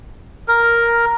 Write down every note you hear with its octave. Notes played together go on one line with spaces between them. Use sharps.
A#4